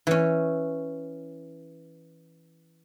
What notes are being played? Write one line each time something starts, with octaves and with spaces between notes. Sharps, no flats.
E3 C#4